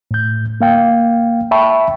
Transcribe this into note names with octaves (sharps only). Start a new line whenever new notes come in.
A2 G6
A#3 F5 G5
E5 G5 A5 B5 C#6